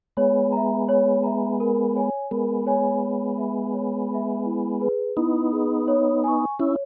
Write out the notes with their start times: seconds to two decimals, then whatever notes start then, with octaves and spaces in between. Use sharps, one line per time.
0.17 G#3 B3 C#5
0.52 E5 A#5
0.89 C#5
1.23 E5 A#5
1.60 A#4
1.96 C#5 G#5
2.31 G#3 B3 A#4
2.67 C#5 G#5
3.03 C#5
3.38 E5 B5
3.74 C#5
4.09 E5 B5
4.46 E4
4.81 G#4 B4
5.17 B3 D#4 E4
5.52 G#4 B4
5.88 C#5
6.24 G#5 C#6
6.59 C#4 E4 C#5